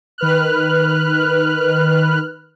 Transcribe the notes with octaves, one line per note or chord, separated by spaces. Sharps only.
D#3 B4 F6 F#6